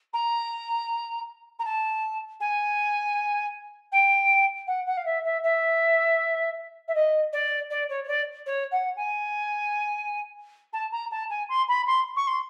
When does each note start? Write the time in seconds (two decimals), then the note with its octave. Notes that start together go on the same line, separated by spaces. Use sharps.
0.13 A#5
1.59 A#5
1.64 A5
2.40 G#5
3.92 G5
4.67 F#5
4.86 F#5
4.97 F5
5.05 E5
5.24 E5
5.43 E5
6.88 E5
6.94 D#5
7.32 D5
7.70 D5
7.89 C#5
8.03 C#5
8.08 D5
8.46 C#5
8.71 F#5
8.96 G#5
10.73 A5
10.91 A#5
11.10 A5
11.30 G#5
11.49 C6
11.68 B5
11.86 C6
12.16 C#6
12.27 C6